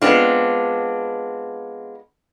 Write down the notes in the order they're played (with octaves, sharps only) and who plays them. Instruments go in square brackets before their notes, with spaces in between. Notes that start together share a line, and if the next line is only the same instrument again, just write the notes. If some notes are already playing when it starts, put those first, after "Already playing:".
[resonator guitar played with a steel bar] G#3 B3 C4 D4 F4